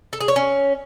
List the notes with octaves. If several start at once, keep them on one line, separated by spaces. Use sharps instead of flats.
A4
G#4
C#5
C#4